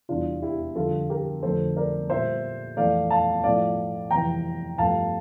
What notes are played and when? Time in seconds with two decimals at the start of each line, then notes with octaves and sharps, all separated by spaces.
0.09 E2 C3 E3 G3 D4 F4
0.42 E4 G4
0.75 F2 D3 G3 F4 A4
1.10 G4 A#4
1.43 F2 D3 F3 A3 A4 C5
1.77 A#4 D5
2.10 A#2 G3 C5 E5
2.77 F2 E3 A3 D5 F5
3.11 F5 A5
3.44 A2 F3 A3 D5 F5
4.11 F2 C3 E3 G5 A#5
4.78 G2 F3 A3 F5 A5